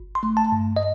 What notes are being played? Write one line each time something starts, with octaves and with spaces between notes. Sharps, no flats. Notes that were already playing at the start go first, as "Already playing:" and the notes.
Already playing: G1
C6
A3
A5
G2
D#5